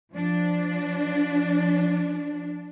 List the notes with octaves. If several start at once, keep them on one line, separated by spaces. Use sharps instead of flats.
F3 D4